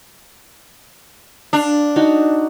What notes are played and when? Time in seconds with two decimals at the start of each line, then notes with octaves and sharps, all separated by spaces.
1.53 D4 F5
1.96 D#4 F#4